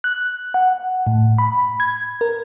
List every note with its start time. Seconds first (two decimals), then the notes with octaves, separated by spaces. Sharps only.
0.04 F#6
0.54 F#5
1.07 A2
1.38 B5
1.80 G#6
2.21 A#4